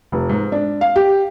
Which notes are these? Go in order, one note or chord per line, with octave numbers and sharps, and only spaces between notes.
F1
G#2
D4
F5
G4